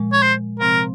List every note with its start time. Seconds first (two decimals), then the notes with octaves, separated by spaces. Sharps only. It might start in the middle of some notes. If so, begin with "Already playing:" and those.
Already playing: A#2 F3 G#3
0.13 C#5
0.23 C5
0.60 C3 F3 C4 A#4